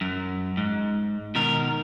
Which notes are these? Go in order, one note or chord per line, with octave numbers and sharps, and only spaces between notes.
F#2
G#2
B2 D#3 A#4